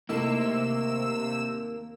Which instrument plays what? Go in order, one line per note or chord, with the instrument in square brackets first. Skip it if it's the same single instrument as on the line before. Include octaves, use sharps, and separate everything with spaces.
[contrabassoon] D#2 [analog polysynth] C3 E6 E7 [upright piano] A3 D#4 E4 [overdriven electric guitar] A#3